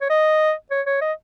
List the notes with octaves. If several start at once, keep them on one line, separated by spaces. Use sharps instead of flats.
C#5
D#5
C#5
C#5
D#5